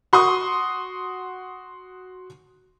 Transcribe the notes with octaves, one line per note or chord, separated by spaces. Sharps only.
F#4 C6 C#6 D#6